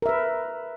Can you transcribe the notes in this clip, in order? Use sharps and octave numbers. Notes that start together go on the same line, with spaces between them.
A#4 B4 E5